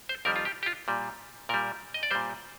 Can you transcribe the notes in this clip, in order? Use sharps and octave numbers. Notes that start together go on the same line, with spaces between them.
C5
F2 D#3 G3 A#4
F4
G4
G4
F4
A#2 G3
A#2 G3 A#4
D#5
D5
A#2 G3 C5